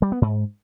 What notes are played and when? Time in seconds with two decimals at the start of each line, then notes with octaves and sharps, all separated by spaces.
0.02 G3
0.12 B3
0.22 G#2